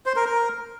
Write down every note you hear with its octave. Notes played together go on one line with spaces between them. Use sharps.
C5
A#4
A#4